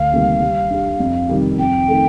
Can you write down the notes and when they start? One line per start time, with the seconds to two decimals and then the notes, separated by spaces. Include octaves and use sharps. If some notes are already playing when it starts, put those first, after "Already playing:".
Already playing: D2 F5
0.12 C3 D#3 G3 A#3
0.40 G3
0.70 D4 G4
0.99 F2
1.29 C3 D#3 G3
1.58 F2 G5
1.88 D#3 A3